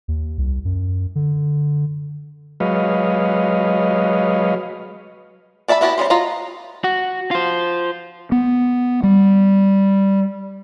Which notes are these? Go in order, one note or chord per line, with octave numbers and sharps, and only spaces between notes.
D#2
C2
F#2
D3
F#3 G#3 B4 C#5 D#5 F5
D4 D5 E5 A5 B5
B3 E4 F#4 G4 A5
G3 C#4 G#4 C5
F4 F#4 D#5 A#5
F#4
F4 C5
B3
G3